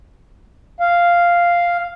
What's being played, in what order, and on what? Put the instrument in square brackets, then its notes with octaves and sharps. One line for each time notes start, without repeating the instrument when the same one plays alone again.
[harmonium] F5